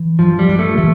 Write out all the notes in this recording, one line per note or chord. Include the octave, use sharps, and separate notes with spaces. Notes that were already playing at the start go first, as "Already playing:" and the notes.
Already playing: E3
G2 F3
G3
G2
A3
E3 A3